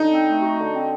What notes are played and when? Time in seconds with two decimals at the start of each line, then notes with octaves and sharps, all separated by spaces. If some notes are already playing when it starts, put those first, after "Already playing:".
Already playing: D3 D#4
0.09 C4
0.26 A3
0.42 F#4
0.58 D3
0.74 C4